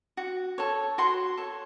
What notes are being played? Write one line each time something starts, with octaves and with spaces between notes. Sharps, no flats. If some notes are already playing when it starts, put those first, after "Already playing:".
F#4
A4 C#5
F#4 C6
A4 C#5